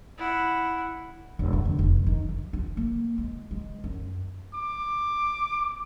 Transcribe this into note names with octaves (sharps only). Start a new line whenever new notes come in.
E4 F#5
E1
F2
D3
F1
D#3
E3
F4
A#3
G#3
G#3
F#2
D6